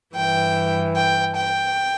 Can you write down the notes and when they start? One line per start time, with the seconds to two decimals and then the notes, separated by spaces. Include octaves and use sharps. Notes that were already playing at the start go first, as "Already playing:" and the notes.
0.14 G2 E3 G5
0.96 G5
1.35 G5